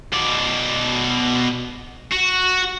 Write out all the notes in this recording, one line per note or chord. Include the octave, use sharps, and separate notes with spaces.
B2 D5
F#4